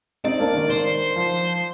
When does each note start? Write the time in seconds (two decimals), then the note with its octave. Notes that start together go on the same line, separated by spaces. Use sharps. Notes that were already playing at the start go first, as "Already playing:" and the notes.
0.24 C4 D#4 D5
0.39 A#3 D4
0.55 D#3
0.70 C5
1.16 F3